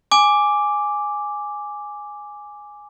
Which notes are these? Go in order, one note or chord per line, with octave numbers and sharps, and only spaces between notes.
G#5 D6